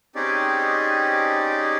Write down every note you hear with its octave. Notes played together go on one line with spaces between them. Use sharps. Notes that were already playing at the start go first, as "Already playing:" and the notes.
C4 C#4 D#4 G4 G#4 D5